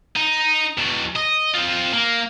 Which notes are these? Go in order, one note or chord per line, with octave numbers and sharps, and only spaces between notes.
D#4
E2 B2
D#5
C4 F4
A#3